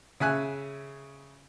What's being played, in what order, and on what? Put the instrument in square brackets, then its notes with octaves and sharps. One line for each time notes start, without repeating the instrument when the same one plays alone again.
[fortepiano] C#3 E5 G#5 F#6